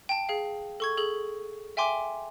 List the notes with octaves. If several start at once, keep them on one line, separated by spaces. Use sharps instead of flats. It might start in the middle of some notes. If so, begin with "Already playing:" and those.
G5 A5
G#4 F5
A4 C#6 G#6
G#4 A4 F#7
E5 G5 G#5 C6 D6